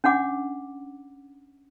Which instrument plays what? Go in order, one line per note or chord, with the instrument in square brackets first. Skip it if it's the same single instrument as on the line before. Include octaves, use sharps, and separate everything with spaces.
[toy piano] C#4 D4 F#5 D6